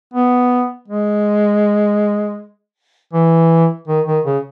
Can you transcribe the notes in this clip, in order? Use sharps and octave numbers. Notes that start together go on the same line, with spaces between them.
B3
G#3
E3
D#3
D#3
C#3